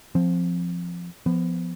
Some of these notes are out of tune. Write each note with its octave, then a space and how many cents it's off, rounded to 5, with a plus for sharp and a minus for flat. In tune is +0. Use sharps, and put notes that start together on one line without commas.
F3 +0 C4 +0
F3 +0 B3 +15